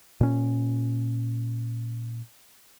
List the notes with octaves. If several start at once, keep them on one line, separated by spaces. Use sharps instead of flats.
A#2 C#4